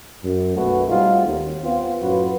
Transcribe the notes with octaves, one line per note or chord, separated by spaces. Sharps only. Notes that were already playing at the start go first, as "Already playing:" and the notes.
F#2
B1 F#2 A#2 A3 F#4 B4
G3 A3 C4 D#4 F4 F#4
D#2
B3 C4 F4
F#2 A2 F4 F#4 B4